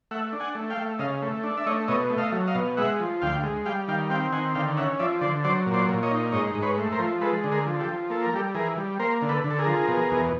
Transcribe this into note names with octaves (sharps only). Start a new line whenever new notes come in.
A3 E5 F#5
D4
F#5 G#5
A3
F5 G5
A3
C#3 D#5 F5
A3
D4
E5
A3 C#5 D#5
B2 C#5 D#5
A3
D#5 F5
F#3
D#5 F5
B2
G#3 E5 F#5
F3
D2 F5 G5
G#3
G3 F5 G5
D#3 F5 G5
C4 F5 G5
D#3 F#5 G#5
D3 F5 G5
C#4 E5 F#5
F3 D5 E5
D3 C5 D5
F#3 C5 D5
A#2
C5 D5
A#2
C#5 D#5
D#4
G#2 C#5 D#5
G#2
B4 C#5
A3
A#4 C5
F3
G#3 A4 B4
D3
G#4 A#4
F3
G4 A4
F3
A#3 A4
A#4
G3 G4 A4
E3 G#4 A#4
G3
A#3 A#4 C5
D3
A4 B4
D3
A4
G#4 A#4
F3
B2
E2